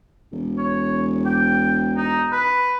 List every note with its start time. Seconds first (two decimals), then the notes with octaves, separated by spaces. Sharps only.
0.32 E1
0.58 C#5
1.26 G5
1.97 D#4
2.32 B4